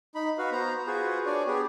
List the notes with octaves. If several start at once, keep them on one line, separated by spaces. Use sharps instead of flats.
D#4 B5
F#4 B4 F5
B3 C5 A#5
F4 F#4 G#4 B4 C5
D4 C#5 D5 G#5
B3 G4 G#4